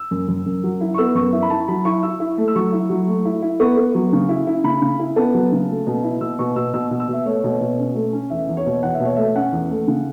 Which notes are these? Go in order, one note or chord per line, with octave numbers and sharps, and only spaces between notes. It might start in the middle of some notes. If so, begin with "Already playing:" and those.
Already playing: E6
F#2
F#2
F#2
F#3
E4
C#6
B3 E6
F#2 C#6
E4 E5
B5
E4 A5
F#3 B5
E4 C#6
E4 E6
E4
A3
E6
F#3 C#6
E4
F#3
A3
E4
E4
B3 C#6
B3
F#3
C#3
E4
E4
C#3 B5
C#3
E4
B3 A5
F#3
C#3
A3
B2
E4
B2 E6
B2 C#6
B2 E6
B2 E6
B2
E6
B2 E5
A3 C#5
B2
B2
C#4
A3
C#4
E2 E5
E2
C#5
B2
E2 F#5
E5
B2 C#5
A3 E5
C#4 F#5
E2
A3
C#3